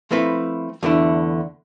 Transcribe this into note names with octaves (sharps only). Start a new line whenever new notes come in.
F3 A3 C4 E4 B4
E2 D3 A3 E4